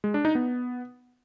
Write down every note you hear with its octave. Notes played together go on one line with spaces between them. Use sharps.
G#3
D4
D#4
B3